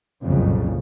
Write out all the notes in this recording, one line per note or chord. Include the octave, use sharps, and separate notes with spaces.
F#1 C2 F2 A#2 C#3